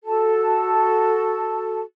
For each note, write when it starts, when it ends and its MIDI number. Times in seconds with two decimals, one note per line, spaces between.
0.04 1.81 66
0.04 1.81 69
0.04 1.81 81